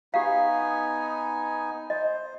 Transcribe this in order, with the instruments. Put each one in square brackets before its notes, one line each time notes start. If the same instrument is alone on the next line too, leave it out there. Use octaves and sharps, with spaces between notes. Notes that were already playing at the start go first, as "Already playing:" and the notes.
[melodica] B3 D#4 G#5 [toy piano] G4 F5
[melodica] C5 [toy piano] D#5